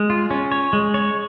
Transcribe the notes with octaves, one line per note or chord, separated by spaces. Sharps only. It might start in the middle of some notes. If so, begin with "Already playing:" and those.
Already playing: G#3
F4
C#4
C#5
G#3
C#5